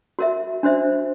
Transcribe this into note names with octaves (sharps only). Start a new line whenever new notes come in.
F#4 A#4 E5
D4 F#4 C5 E5